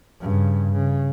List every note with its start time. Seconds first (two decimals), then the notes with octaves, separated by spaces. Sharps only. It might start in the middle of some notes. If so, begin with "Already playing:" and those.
0.21 G2 C#3
0.71 C#3